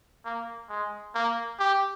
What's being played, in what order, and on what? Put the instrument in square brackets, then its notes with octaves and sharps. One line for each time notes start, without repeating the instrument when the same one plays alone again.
[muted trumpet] A#3
G#3
A#3
G4